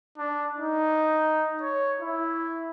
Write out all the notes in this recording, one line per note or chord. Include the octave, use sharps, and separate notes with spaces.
D4
D#4
C#5
E4